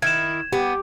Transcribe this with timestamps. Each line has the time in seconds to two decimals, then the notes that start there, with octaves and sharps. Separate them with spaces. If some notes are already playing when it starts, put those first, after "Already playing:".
0.02 D#3 E4 G#6 E7
0.53 B3 G4